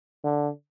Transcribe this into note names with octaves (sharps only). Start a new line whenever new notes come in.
D3